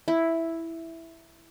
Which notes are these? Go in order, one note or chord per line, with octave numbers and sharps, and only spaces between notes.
E4